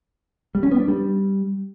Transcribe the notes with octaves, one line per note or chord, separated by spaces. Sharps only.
G3
C#4
B3
D4
G3